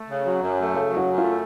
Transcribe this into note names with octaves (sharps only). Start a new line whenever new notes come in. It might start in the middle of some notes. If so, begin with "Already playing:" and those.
Already playing: A3
C#3
F#3
F#2
A3
C#3 A4
F#3
F#4
F#2
F4
A3